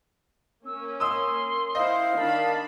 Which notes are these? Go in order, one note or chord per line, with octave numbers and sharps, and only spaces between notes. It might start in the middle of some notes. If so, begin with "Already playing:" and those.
A#3 C#4 E6
C6 D#6 E6
E4 C5 D#5 F5
D#3 D4 A5 B5